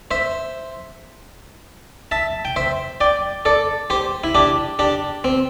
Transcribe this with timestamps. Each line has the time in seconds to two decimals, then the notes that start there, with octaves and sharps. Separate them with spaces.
0.11 C5 E5
2.11 E5 A5
2.45 G5
2.56 C5 E5
3.01 D5 G5
3.45 A4 D5
3.90 G4 C5
4.24 E4
4.35 D4 G4
4.79 D4 G4
5.24 C4